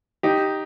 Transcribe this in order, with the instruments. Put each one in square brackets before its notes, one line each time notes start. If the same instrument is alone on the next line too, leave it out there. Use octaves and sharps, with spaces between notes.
[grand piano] D#4 G4